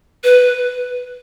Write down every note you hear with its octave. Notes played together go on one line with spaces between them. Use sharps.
B4